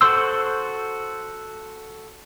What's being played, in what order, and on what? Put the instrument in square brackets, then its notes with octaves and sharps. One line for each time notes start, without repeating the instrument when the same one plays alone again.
[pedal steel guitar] F#4 A4 C5 C6 E6